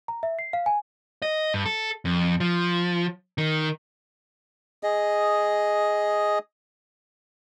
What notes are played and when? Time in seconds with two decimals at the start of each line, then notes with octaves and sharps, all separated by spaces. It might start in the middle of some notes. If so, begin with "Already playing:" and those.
0.08 A#5
0.23 E5
0.39 C7
0.53 F5
0.66 G#5
1.22 D#5
1.54 G2
1.65 A4
2.05 F2
2.40 F3
3.38 D#3
4.83 G#4 D#5